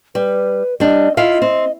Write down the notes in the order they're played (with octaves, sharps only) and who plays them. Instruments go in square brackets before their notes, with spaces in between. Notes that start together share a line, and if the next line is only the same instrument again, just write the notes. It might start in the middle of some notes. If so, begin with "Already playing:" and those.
[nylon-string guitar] G3 [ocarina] B4
[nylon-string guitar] G3 D4 [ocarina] D#5
[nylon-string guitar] E4 F4 F5 [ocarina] D#5
[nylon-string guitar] C4